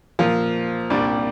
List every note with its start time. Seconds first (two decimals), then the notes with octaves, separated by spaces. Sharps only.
0.19 A#2 F3 A#3
0.90 C2 A#2 G3 D4